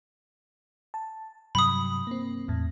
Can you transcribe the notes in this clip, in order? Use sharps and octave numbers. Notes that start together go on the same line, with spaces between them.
A5
G2 C3 F#3 B5 D#6
A#3 C4
E2 A2